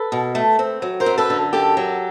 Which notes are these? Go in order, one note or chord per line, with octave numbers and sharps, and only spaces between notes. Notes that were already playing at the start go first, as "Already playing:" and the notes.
Already playing: A4 B4
B2
A3
C4
F#3
A#4 C5
F#2
A4 B4
D3
F#2 G4 A4
F#3